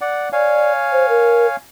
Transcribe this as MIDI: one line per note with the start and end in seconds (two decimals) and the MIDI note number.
0.01 0.29 74
0.01 0.29 78
0.33 1.56 73
0.33 0.72 74
0.33 1.56 77
0.33 1.56 80
0.92 1.06 72
1.09 1.46 70